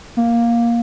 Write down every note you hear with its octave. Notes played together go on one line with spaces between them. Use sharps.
A#3